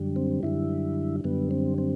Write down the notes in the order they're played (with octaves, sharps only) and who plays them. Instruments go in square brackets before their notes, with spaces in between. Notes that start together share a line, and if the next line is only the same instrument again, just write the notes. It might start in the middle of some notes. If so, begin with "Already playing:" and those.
Already playing: [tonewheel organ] F#2 D3 G3
C4
F#2 D3 G3 E4
F#2 D3 G3 B3
C4
C4